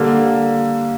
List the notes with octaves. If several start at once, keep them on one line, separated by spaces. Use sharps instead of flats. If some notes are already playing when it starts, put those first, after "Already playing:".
Already playing: D3 G3 A#3